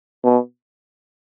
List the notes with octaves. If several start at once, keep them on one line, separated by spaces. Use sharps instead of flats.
B2